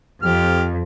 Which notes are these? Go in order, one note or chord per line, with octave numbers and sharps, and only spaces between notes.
F2 G4 F6